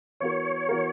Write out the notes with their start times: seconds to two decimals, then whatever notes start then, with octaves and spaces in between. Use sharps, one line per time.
0.20 E3 B3 F#4 A#4 C#5
0.69 E3 B3 F#4 A#4